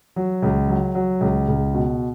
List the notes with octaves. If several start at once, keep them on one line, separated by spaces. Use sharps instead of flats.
F#3
C#2
F#3
F#3
C#2
C#2
B2